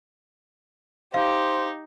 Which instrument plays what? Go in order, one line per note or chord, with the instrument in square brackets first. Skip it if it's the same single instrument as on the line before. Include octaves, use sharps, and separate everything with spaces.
[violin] D#4 [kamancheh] G4 [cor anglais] C5 [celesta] F5